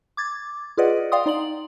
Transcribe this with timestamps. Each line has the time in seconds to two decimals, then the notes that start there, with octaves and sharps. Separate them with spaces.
0.17 D6 G#6 A6
0.77 F4 G#4 B4 D5 D#5 F#5
1.12 D5 F5 G5 C6 D#6
1.26 D#4 D5 C6 F#7